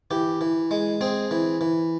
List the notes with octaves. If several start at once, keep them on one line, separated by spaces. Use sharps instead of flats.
E3 G4
E3
G#3
C4 G#4
E3
E3